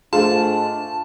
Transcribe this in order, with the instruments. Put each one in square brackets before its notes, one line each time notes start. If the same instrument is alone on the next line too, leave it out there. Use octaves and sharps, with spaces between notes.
[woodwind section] G#2 D4 [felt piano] A3 F4 [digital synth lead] A5